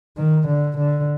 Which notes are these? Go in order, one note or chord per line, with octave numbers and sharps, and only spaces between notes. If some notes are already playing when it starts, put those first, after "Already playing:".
D#3
D3
D3